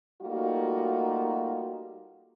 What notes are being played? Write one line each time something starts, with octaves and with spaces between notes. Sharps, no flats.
G3 A3 A#3 D#4 F4 F#4